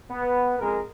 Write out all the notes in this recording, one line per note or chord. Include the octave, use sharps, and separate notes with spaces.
B3
F2 G#3 A#4